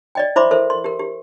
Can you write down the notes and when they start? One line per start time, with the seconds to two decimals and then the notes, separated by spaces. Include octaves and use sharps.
0.15 D5 D#5 G5
0.36 E4 C5 E5 B5 C6 D6
0.51 A4 A#4 C5 E5
0.70 C6
0.84 G4 A#4
0.99 G4